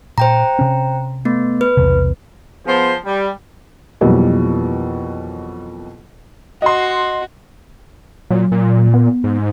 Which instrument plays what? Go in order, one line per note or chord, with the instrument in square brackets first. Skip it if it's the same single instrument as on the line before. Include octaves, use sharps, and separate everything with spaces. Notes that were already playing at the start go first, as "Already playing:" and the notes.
[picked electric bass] A#2 [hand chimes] C5 G5 A#5
[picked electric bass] C3 C#4
[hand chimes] A3 B3
B4
[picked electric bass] B1 E2 C3
[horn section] F3 B3 G#4 C5
G3
[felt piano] F2 B2 E3 F#3 G3 A#3
[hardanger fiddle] F#4 [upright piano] D#5 C6
[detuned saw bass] A#2 [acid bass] F#3
[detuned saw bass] A#2
[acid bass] B3
[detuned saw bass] G#2